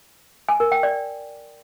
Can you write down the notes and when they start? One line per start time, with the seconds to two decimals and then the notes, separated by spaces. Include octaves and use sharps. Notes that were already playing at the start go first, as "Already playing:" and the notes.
0.49 G#5
0.60 A#4
0.72 G5
0.83 D5